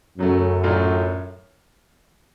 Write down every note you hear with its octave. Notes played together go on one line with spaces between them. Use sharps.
F#2 C#3 F#3 A3
A2 F#3 A3 D4 F4